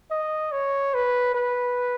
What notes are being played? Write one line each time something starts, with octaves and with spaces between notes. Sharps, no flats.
D#5
C#5
B4
B4